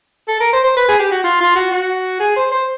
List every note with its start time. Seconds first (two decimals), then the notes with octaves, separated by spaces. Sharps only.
0.28 A4
0.40 A#4
0.53 C5
0.64 C5
0.77 B4
0.88 G#4
1.00 G4
1.12 F#4
1.24 F4
1.40 F4
1.55 F#4
1.72 F#4
2.20 G#4
2.36 C5
2.52 C5